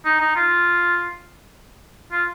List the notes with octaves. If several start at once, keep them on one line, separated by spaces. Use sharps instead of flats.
D#4
D#4
F4
F4